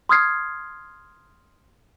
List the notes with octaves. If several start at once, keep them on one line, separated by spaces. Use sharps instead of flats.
C6 D#6 F6 G#6 C7